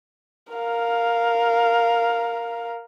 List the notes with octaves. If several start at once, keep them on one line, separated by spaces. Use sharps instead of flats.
A#4 F5